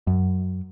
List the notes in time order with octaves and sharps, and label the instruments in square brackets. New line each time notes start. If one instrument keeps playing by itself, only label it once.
[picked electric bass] F#2